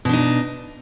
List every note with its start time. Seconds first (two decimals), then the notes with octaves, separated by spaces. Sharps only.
0.05 B2
0.09 D4
0.13 D#4